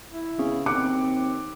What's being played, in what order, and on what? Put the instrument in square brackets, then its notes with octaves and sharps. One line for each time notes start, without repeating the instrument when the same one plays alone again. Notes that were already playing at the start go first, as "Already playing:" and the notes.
[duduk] E4
[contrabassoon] C#3 [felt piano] B3
[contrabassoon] D#2 [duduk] C4 [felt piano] D6 F#6 C#7